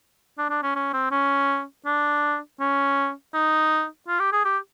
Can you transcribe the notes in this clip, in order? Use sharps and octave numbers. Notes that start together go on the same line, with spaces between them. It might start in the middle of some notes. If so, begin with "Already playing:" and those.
D4
D4
C#4
C#4
C4
C#4
D4
C#4
D#4
F4
G4
G#4
G4